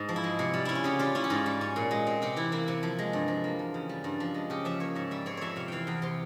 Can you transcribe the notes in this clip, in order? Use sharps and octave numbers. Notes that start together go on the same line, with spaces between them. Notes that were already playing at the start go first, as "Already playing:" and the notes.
Already playing: G#2
F3
E4
G#3
C3
G3
C#4 E4
F4
C#3 G4
G3 F4
C#4 E4
G4
G#2 F4
G3
C#4
A#2
G#3
C4
C3 G4
E3 E4
A#3 E4
C3
F3
G#3
G2
F3
A#3
E2
C#3
G3
G2
F3
G#3
C#3 G4
F3 E5
A#3 C#5
G#2 E5
G3 E5
C4 C#5
F2 C#5 E5
C3 F5
E3 F5 G5
E2 G5
C3 C6